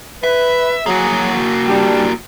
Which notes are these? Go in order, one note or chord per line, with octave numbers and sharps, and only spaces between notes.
B4 E5
F#3 A#3 F#4 G#4
G3 D4